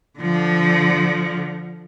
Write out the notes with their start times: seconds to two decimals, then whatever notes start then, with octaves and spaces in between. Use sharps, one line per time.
0.19 D3 F3